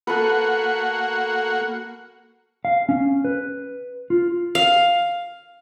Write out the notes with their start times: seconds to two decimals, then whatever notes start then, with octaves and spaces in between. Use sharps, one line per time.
0.07 A#3 F#4 A4 B4 F#5
2.65 F5
2.89 C#4
3.25 B4
4.10 F4
4.55 F5